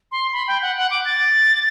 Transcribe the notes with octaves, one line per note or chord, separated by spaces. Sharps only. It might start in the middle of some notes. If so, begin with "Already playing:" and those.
C6
B5
G5
F#5
F#5
D6
A6